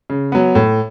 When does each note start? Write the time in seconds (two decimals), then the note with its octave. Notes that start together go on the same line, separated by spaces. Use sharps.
0.10 C#3
0.32 F#3 B3
0.55 A2